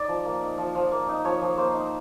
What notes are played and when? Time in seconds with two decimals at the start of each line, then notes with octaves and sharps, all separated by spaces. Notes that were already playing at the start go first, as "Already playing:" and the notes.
Already playing: D#4 D5
0.08 F3
0.25 A#3
0.41 D#4
0.58 F3
0.75 F3
0.92 A#3
1.09 D#4
1.25 F3 C#5
1.41 F3
1.58 A#3 C5
1.75 D#4